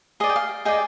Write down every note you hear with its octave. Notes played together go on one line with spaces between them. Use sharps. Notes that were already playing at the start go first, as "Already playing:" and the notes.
G#4 D5 D#5
G5
F5
G#4 D5 D#5 G5